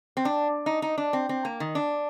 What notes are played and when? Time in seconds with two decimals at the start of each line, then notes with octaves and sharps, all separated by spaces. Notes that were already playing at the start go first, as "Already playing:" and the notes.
0.17 C4
0.25 D4
0.66 D#4
0.82 D#4
0.98 D4
1.13 C4
1.29 C4
1.45 A#3
1.60 D#3
1.75 D4